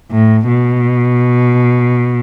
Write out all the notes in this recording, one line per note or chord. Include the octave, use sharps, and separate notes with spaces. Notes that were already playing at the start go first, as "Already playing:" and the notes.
A2
B2